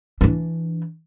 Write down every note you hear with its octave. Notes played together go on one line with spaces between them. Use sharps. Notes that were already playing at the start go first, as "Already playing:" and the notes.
E3 D4